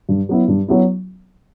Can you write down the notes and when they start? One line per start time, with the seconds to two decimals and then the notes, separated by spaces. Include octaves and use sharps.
0.09 G2
0.29 F#3 B3 E4
0.48 G2
0.68 F#3 B3 E4